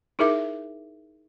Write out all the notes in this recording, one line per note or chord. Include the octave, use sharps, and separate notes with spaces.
D#4 E4 G#4 A#4 E5 D6